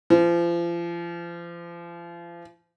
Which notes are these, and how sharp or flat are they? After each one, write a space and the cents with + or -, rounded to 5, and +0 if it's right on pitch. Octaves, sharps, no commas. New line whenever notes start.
F3 -35